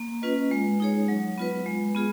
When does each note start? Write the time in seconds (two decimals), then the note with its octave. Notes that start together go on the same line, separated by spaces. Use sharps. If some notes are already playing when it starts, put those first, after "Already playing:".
Already playing: A#3
0.22 C#4 F4 B4 D#5
0.51 G#3
0.80 D#4 G#4 C#5
1.08 F#3
1.38 B3 F4 B4
1.66 G#3
1.95 B3 F4 G#4